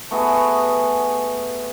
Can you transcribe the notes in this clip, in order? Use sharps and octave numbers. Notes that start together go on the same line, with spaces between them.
A3 B3 F#4 G#4